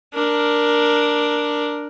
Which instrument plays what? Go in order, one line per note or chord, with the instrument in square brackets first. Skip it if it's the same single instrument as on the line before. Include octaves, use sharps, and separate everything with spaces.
[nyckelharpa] D4 A#4